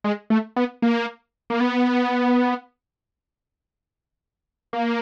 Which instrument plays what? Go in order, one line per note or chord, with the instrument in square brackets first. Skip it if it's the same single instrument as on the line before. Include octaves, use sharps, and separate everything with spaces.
[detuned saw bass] G#3
A3
B3
A#3
A#3
B3
A#3